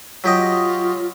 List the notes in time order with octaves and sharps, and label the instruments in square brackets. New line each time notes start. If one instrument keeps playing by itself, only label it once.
[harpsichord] F#3 G4 D#5 [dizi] F4